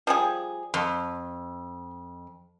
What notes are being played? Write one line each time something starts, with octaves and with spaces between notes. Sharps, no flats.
F3 G3 G#4
F2 C6